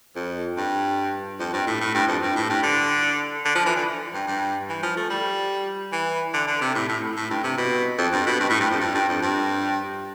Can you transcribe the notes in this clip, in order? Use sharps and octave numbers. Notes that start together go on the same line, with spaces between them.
F2
G2
F2
G2
A2
A2
G2
F2
G2
A2
G2
D3
D3
F3
E3
D3
G2
G2
E3
F3
A3
G3
E3
D3
D3
C3
A2
A2
A2
G2
C3
B2
F2
G2
B2
G2
A2
G2
F2
G2
G2
F2
G2